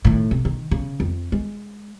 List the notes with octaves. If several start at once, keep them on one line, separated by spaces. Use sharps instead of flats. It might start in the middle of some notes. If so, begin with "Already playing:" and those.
A2 D#3
C3
D#3
C#3
F2
G#3